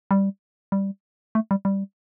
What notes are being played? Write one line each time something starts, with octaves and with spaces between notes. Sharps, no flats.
G3
G3
A3
G3
G3